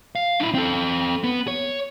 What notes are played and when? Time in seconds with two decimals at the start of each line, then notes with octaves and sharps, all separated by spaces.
0.15 F5
0.40 D4 E4
0.55 C4 A4
1.24 B3
1.48 C#5